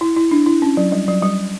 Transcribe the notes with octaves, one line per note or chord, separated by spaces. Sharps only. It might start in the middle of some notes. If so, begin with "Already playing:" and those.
E4
E4
D4
E4
C#4
F#3
G3
F#3
G3